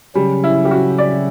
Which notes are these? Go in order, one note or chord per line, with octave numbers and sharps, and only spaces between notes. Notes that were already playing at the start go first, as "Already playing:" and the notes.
C#3 F#3 G3 C#4
E4
G4
F#4
D5